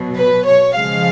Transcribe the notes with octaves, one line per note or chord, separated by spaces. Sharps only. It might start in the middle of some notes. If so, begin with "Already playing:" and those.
Already playing: B2 F#3
B4
C#5
C#3 F3 G#3 F5